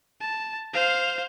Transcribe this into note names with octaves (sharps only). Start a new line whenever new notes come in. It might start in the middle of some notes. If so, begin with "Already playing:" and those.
A5
C5 F5